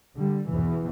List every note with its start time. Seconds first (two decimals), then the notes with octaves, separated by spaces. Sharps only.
0.16 D3 G3
0.49 E2 B2 E3